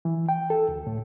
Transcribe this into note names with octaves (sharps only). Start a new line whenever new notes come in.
E3
G5
A4
D2
A2